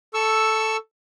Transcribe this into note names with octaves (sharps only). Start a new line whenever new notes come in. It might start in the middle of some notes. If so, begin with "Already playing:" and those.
A4 C#6 E6